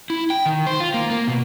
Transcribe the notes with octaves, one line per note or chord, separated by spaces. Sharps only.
E4
G5
D#3
C5
F4
A#3
A#3
B2